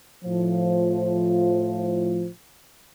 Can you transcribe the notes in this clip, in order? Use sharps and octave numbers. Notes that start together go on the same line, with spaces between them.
A2 F3